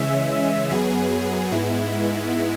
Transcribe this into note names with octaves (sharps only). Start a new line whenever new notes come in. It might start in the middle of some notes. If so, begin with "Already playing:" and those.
Already playing: C#3 E3 G#3 C#4 E5
F#2 F#3 B3 G#4
G#2 G#3 B3 E4